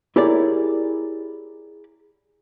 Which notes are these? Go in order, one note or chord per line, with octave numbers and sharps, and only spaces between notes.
E4 G4 G#4 A#4 C#5 D5